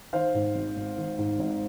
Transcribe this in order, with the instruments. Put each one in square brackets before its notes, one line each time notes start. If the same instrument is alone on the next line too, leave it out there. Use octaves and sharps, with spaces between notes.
[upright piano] D#3 C5 F5
G#2
G#1
G#1
D#3
G#2
G#1